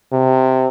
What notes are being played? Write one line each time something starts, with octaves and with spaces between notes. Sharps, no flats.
C3